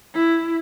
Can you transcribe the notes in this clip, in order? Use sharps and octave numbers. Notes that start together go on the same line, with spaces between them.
E4